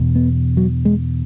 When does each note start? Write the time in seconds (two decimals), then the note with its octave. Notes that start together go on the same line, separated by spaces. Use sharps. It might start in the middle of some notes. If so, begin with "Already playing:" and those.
Already playing: E2 B2
0.15 B3
0.57 F#3
0.85 G#3